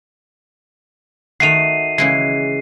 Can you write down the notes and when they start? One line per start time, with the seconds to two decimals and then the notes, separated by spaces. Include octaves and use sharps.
1.40 D#3 A3 F#4 C7 D#7 F7
1.98 C#3 E3 G#3 C7